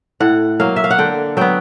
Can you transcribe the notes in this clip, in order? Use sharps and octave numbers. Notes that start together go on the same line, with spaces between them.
A2 F#5
F#3 A#3 F5
E5
F5
F#5
D3 G5
F#3 B3 G5